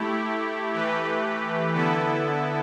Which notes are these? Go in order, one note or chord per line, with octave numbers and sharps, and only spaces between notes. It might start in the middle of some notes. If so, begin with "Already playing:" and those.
Already playing: A3 E4 G4
E3 A3 G4 B4
D3 B3 E4 A4